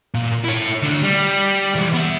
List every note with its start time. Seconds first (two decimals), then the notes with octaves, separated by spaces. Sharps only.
0.14 A#2
0.44 E4 C#5
0.82 D2 D4
1.03 G3
1.75 E3 G#3
1.93 B3 E5